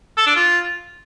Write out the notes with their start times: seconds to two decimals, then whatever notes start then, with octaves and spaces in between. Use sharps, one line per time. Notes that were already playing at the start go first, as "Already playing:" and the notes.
0.17 A4
0.26 D4
0.35 F4